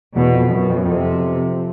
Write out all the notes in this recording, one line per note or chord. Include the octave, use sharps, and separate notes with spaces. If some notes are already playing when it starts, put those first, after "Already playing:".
E2 B2
F2
F#2 B2
F2
F#2
F2 C3